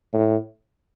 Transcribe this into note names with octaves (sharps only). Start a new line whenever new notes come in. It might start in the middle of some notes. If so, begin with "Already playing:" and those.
A2